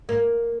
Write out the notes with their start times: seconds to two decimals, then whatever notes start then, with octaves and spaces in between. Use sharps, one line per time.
0.09 A#3